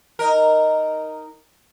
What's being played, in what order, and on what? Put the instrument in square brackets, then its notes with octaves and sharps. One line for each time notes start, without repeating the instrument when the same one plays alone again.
[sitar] D#4 A#4